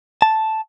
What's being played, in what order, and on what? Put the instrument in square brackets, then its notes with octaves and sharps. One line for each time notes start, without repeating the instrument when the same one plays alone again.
[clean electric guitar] A5